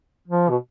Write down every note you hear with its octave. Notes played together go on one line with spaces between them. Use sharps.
F3
B2